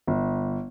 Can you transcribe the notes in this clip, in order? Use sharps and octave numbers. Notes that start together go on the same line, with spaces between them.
G1